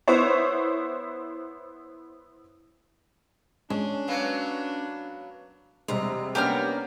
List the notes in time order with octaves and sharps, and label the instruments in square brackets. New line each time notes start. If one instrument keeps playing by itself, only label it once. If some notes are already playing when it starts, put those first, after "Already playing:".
[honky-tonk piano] B3 E4 C5 C#5
[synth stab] G#3 [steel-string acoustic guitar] C#4 [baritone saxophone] D4
[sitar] F#3 A#3 B3
[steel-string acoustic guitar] E2 D#5 A#5 [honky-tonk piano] C3 G3 G#3
[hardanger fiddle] A#3 B3 [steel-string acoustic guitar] C#4 D4 C#5 [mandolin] G4 A#5 F6